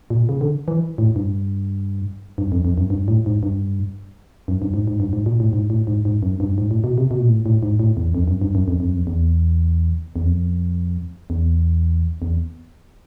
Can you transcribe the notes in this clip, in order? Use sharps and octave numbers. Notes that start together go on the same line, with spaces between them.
A#2
C#3
D3
E3
A2
G2
G2
F2
F2
F#2
G2
A2
G#2
G2
F#2
G2
G#2
G#2
G2
G#2
A#2
A2
G#2
A2
G#2
G#2
F#2
G2
G#2
A2
B2
C3
B2
A#2
A2
A2
G#2
A2
E2
F2
F#2
G2
F#2
F2
F2
F#2
F2
E2
E2
F2
E2
E2